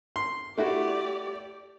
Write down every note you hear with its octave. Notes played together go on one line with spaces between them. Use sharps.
C6
A3 E4 F#4 G4 D5